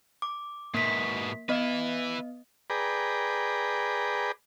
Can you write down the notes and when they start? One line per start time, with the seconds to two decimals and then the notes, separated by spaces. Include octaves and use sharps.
0.22 D6
0.74 G#2 B2 A#3 B6
1.49 B3 B4 D#5 E5
2.70 G#4 B4 D5 G5 A#5